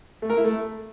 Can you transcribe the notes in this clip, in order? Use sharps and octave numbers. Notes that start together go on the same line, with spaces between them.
A3
A#4
E4
A3